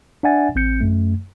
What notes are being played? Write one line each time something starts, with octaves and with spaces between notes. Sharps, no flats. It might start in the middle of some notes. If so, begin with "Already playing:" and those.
D4 D5 E5 F#5 G#5 A6
A1 C4 G6 C#7
F#2 A3